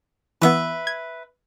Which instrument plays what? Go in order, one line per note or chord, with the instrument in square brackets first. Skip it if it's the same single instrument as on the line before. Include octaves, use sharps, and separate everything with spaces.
[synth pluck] E3 B3 [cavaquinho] B4 E5
[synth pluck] G#6